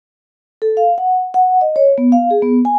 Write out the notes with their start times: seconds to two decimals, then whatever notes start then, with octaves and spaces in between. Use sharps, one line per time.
0.62 A4
0.77 F5
0.98 F#5
1.34 F#5
1.61 D#5
1.76 C#5
1.98 B3
2.12 F5
2.31 G#4
2.42 B3
2.65 G#5